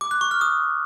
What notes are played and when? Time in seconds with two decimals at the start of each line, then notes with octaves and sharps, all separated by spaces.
0.01 D6
0.11 F#6
0.21 C#6
0.31 F6
0.41 D#6